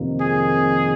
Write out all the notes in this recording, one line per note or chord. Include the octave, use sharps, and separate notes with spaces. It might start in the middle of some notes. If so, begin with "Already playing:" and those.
Already playing: F2 C3 D#3 A#3
G#4